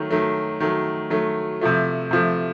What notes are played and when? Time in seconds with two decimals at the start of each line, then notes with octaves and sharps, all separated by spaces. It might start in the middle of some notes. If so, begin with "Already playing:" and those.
Already playing: D#3 F#3 A3
0.11 D#3 F#3 A3
0.60 D#3 F#3 A3
1.10 D#3 F#3 A3
1.61 C3 F3 A3
2.11 C3 F3 A3